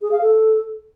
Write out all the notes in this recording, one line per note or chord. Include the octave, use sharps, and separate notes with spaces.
G#4
F5
A4